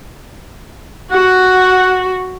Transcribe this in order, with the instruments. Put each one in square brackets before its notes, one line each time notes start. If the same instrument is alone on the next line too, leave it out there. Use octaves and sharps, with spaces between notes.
[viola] F#4 [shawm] F#5